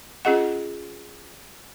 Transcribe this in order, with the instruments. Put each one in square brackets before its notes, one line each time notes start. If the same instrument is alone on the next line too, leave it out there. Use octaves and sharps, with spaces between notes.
[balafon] C#4 F4 G#4 D#5 F#5